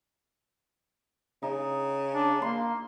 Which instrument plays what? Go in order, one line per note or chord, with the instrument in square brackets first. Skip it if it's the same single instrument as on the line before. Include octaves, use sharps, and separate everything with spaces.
[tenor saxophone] C#3 [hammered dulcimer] D#4
[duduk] D4
[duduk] A#3 [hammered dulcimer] C6